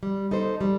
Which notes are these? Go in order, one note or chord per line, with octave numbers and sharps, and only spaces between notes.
G3
D#4 A4 C5
G3